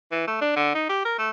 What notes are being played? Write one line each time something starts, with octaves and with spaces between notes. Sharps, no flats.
E3
A3
D4
D3
D#4
G4
A#4
A3